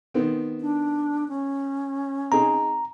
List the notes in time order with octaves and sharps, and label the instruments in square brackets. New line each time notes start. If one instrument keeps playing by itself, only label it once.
[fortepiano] D#3 B3 C4
[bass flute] D4
C#4
[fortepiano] C4 D#4 G#4 [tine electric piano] A#5